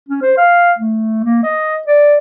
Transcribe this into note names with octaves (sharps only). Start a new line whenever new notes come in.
C#4
C5
F5
A3
A#3
D#5
D5